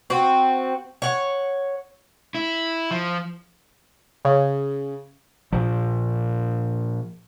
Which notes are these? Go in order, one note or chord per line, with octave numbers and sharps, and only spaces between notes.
C4 F#4
C#5 F#5
E4
F3
C#3
A#2 F3